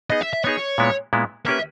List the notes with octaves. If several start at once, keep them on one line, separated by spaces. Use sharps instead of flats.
B3 D#4 G#4 D#5
E5
E5
B3 D#4 G#4 C#5
A#2 G#3 B3 E4
A#2 G#3 B3 E4
A#3 C#4 G4 B4 E5